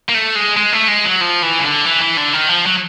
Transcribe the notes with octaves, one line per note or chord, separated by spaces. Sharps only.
A#3
A3
G#3
G#3
A3
G#3
F#3
F3
E3
C#3
D3
E3
E3
D3
D#3
F3
F#3